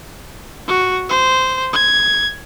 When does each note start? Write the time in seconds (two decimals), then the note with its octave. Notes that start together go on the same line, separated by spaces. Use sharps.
0.68 F#4
1.10 C5
1.73 G#6